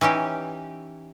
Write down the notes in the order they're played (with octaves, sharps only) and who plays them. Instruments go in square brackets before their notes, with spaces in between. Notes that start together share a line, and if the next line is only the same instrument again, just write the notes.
[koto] E3 C#4 D#4 G4